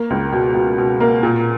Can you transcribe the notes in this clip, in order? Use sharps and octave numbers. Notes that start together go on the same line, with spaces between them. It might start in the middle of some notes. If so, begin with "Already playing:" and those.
Already playing: A#3
C#2
B2
B2
B2
A#3
A#2